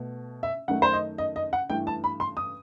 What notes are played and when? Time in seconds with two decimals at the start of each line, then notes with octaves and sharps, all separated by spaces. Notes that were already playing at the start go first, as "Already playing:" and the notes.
Already playing: B2 A3
0.43 E5
0.68 F#2 D#3 A3 F#5
0.82 C5
0.93 D#5
1.18 D#5
1.36 D#5
1.53 F#5
1.70 G2 E3 A3 G5
1.87 A5
2.04 B5
2.20 C6
2.37 D#6